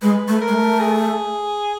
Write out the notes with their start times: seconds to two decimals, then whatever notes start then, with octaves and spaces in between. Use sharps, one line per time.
0.02 G#3 B4
0.28 A3
0.41 A#4
0.48 G#3
0.54 A3
0.80 G#4